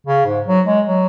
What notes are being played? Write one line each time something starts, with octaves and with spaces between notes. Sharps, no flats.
C#3
G#2
F#3
G#3
F#3